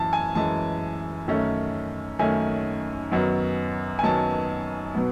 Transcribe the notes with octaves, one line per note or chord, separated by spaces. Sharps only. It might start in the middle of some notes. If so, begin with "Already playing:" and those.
Already playing: F#2 E3 A5
G#5
F#2 E3 G#3 A5
F#2 D#3 A3 C#4
F#2 D#3 A3 C#4 G#5
F#2 D#3 F#3 B3
G#5
F#2 D#3 F#3 B3 A5
B2 F#3 B3